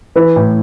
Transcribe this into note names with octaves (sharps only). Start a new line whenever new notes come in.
E3 B4
A2